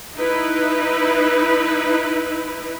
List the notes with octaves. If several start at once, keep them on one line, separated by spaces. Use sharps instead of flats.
D#4 E4 B4